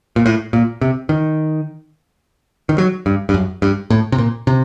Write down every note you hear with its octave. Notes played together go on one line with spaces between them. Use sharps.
A#2
A2
A#2
C3
D#3
D#3
F#3
G2
G2
F#2
G2
A2
C3
A#2
C3